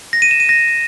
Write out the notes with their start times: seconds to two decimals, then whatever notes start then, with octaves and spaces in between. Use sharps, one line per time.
0.13 A#6
0.22 D#7
0.31 E7
0.40 D#7
0.49 A#6